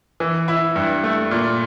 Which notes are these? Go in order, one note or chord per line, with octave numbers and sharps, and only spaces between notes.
E3
E4
G2
A3
A#2